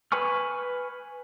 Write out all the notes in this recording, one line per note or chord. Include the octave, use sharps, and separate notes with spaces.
B4 G#5 C#6 F6